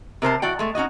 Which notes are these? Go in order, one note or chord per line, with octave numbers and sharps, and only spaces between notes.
C3 A#4 C5 A5
E3 F#4 D5 G5
G#3 A3
C#4 D#4 F#4 D#5